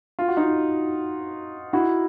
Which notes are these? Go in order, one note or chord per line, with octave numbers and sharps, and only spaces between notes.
F4
F#4
D#4 F4
E4 F#4